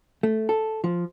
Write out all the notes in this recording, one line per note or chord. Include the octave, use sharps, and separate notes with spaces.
A3
A4
F3